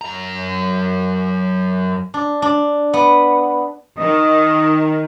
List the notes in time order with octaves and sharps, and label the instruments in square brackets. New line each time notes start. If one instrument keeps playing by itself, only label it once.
[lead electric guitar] F#2 A#5
[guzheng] D4
D4
B3
[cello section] D#3 [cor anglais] D#5